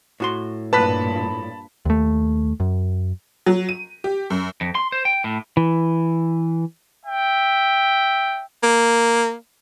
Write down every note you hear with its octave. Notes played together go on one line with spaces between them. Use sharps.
A2 F#4 C6
G2 A#2 B4 A5 B5 B6
D#2 A3
F#2
F#3
D#7
G4
F#2
F2
C6
C5
G5
A2
E3
E5 G5
A#3